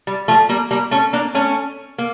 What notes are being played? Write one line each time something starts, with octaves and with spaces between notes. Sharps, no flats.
G3
F3 A3
G3 A#3
G3 A#3
A3 C#4
A#3 D4
A3 C#4
A#3